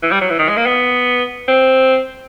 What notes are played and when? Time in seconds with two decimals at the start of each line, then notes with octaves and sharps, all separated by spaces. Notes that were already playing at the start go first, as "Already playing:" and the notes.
0.03 E3
0.11 G3
0.21 F#3
0.30 E3
0.39 D#3
0.49 G#3
0.57 A#3
0.66 B3
1.48 C4